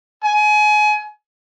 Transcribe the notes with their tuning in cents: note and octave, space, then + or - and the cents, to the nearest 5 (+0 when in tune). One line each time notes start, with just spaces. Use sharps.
G#5 +30